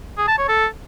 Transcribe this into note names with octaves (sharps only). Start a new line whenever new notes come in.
G#4
A5
C#5
A4